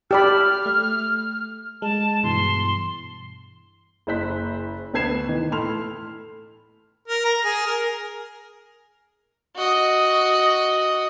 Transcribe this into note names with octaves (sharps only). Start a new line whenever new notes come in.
G4 D5 B5 E6 F6
A3
G#3 A5
G2 B2 E3 C6
F#1 E4 C5 F#6 B6
D2 B3 B4 G#6 C7 E7
D#3 E3
A2 A4 B5 C6 F6 F7
A#4
A#5
G#4
A#4
F#4 D#5